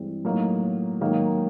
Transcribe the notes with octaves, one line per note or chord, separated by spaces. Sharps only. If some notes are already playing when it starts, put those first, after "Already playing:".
Already playing: G2 E3 G#3 C4
A2 F#3 A#3 D#4
G#2 D#3 F#3 A#3 D#4